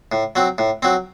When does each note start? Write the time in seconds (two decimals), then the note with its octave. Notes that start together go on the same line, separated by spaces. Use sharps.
0.12 A2
0.36 F#3 C4
0.58 A2
0.82 F#3 C4